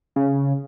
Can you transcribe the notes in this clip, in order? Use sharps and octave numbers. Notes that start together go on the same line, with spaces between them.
C#3